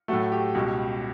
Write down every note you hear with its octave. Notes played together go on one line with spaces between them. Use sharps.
A2 F#3 A3 F#4
G4
C#2 B2 G3